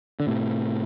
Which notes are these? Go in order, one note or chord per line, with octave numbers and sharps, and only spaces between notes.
D3
A2 C3